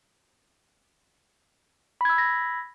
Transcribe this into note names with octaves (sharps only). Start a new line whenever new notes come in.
B5 E6 G#6 A#6 B6